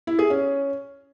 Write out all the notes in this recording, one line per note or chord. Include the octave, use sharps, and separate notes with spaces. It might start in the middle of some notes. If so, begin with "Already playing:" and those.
E4
G#4
C#4